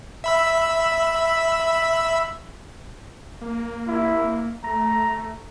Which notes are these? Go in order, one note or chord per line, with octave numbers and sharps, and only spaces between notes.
E5 B5 E6
A#3
E4
A3 A#5